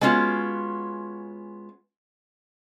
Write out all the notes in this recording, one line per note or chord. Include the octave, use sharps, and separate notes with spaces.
G#3 B3 C#4 F4 F#4